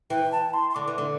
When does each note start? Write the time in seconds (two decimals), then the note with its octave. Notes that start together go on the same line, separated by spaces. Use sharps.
0.10 E3 G5
0.32 A5
0.53 C6
0.70 C6
0.75 D3 D6
0.88 E3
0.98 D3